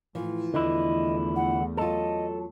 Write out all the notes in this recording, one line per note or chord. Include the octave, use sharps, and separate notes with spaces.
A2 E3 F3
E2 D3 A3 E4 D#5
F#5
F#3 F4 A4 D#5